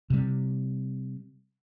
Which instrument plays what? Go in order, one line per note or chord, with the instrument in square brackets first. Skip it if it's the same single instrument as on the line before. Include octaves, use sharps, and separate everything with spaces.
[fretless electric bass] C3 G3